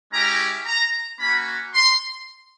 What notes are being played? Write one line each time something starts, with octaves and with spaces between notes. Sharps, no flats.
G#3 C#4 E4 G4 A#5
A#5
A#3 C#4 F#4 B5
C6